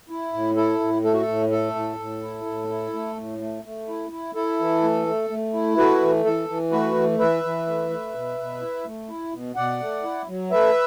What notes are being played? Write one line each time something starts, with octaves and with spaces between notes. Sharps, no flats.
E4
A2
E4 A4
A2
A3 A4
F#4
A4
A2
A3 A4
A2
A2
E4
A2
E4
A3
A2
A3
A3
E4
E4
E4 A4
E3
A3
A3
A3
E4
A3 F#4 B4
E3
E3 A4
E3
A3 F#4 B4
E3
E3 B4 E5
E3
A3
A3
B2
B2
E4
A3
E4
B2
B2 D5 F#5
A3
E4
F#3
A3 B4 E5